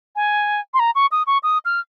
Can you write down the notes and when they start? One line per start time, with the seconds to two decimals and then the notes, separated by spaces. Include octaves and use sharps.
0.16 G#5
0.74 C6
0.80 A#5
0.95 C#6
1.12 D#6
1.27 C#6
1.43 D#6
1.65 F6